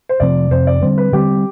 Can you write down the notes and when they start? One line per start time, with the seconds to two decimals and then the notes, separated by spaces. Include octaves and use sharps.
0.09 C5
0.20 F2 C3 F3 C4 D5
0.51 F2 C3 F3 C4 C5
0.67 D5
0.82 D3 G3 C4 C5
0.98 B4
1.12 D3 G3 C4 G4